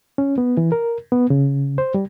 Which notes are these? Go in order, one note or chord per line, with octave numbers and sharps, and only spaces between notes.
C#4
B3
E3
A#4
B3
C#3
C5
G3